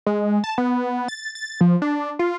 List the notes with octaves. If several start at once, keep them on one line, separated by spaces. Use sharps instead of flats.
G#3
A5
B3
A6
A6
F3
D4
F4